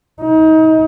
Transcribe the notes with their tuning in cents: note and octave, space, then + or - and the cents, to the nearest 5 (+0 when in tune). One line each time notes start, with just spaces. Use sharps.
D#4 +30